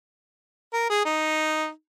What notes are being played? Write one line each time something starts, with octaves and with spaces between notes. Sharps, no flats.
A#4
G#4
D#4